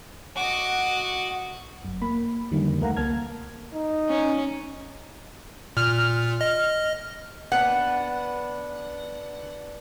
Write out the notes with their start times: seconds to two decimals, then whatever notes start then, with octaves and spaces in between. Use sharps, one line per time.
0.37 F#4 D#5 D6
1.85 G1 F#2
2.02 A#3 B5
2.51 F2 D3 D#3 G3 A#3
2.80 D2 A3 A#4 F5 F#5 A#5
2.97 C#2 A#3 A#4 A5 F6 G#6
3.74 D#4
4.09 C#4
5.77 A#2 F6
6.41 D#5
7.52 B3 D4 F#5